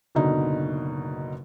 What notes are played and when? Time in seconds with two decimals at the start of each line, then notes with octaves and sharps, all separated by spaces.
0.15 F#1 B2 D3 D#4